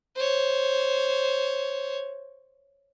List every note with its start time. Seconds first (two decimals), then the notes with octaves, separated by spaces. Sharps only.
0.16 C5 C#5